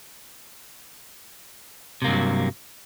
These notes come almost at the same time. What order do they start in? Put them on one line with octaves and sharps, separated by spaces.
C3 A#3 G2 F3 F#3